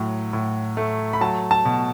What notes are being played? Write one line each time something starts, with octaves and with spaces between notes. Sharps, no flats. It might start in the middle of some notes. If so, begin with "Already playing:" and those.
Already playing: A2 F#3
A2
A3
B5
F#3 A5
A5
B2